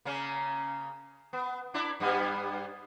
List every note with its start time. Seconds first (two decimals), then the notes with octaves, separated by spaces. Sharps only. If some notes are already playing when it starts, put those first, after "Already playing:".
0.05 C#3 A#3 C#4
1.33 B3
1.74 D4 E4 D5
2.00 G2 G3 B3